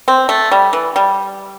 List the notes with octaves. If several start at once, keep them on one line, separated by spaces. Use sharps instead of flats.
C4
A3
G3
E3
G3